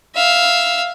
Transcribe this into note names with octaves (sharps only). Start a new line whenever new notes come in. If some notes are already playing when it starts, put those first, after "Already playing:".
E5 F5